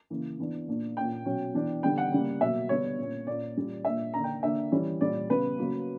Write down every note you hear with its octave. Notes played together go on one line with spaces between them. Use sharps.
C#3 E3 A#3
E3 B3 D4
A#2 A#3 D4
A#2 A#3 C#4 G5
B2 F#3 C#4
E3 B3 D4
D3 G3 B3 G5
F#5
C#3 G3 A#3
B2 F#3 A#3 E5
D3 G3 B3 D4 C#5
A#2 A#3 C#4
A#2 A#3 C#4 D5
A#2 G3 C#4
A#2 A#3 D4 E5
D3 A#3 D4 A#5
G5
D3 A#3 D4 E5
E3 G3 C#4
A#2 G3 C#4 D5
C#3 G3 B3 B4
C#3 F#3 A#3